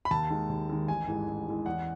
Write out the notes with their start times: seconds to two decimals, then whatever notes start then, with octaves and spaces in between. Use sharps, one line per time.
0.05 B5
0.11 D#2 A5
0.30 D#3 G#3
0.50 D#2
0.69 D#3 G#3
0.88 A1 G#5
1.08 G#2 E3 G#3
1.28 A1
1.47 G#2 E3 G#3
1.66 E2 F#5